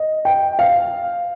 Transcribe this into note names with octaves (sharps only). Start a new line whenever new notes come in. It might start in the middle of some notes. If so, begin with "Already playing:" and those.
Already playing: D#5
G5
F5